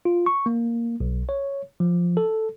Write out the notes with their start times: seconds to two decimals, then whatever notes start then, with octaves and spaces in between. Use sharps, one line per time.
0.05 F4
0.26 C#6
0.46 A#3
1.00 B1
1.29 C#5
1.80 F3
2.17 A4